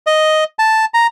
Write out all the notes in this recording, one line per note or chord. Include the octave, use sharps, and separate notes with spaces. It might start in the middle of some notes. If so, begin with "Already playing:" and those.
D#5
A5
A#5